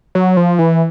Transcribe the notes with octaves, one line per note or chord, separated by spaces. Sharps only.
F#3
F3
E3